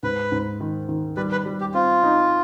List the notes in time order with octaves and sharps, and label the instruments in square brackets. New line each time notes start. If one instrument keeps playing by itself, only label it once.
[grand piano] G#2 [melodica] B4
[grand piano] G#2
D#3
D#3
[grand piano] G3 [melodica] B4
[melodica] B4
[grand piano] G3
[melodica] G4
[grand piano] C4 [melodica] F4
[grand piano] D#4